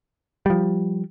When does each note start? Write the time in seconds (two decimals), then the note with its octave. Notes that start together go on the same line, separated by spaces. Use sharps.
0.46 F3 G3